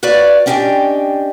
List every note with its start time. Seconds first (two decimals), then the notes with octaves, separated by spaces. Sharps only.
0.03 F#4 B4 C#5 D5 F5
0.46 B3 C#4 D4 G4 D#5 G5